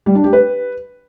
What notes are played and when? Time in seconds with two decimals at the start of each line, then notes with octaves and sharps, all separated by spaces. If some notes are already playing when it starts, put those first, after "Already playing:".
0.06 G3
0.15 D4
0.24 G4
0.33 B4